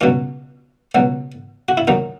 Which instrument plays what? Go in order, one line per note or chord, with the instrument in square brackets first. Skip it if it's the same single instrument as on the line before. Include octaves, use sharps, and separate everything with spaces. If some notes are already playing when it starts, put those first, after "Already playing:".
[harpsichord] C#2 B2 F#3 C#4
C#2 B2 F#3
F#4
E4
D#2 D#3 F#3 D#4